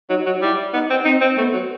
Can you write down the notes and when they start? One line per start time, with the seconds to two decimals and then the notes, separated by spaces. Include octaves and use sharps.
0.09 F#3 D#4
0.26 F#3
0.41 G3 E4
0.73 B3 D#4
0.90 C4
1.05 C4 D#4
1.21 C4
1.37 A3 B3
1.53 F#3